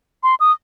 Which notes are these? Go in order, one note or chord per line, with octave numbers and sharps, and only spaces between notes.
C6
D#6